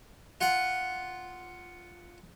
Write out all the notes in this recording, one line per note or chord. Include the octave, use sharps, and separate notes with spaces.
F4 F#5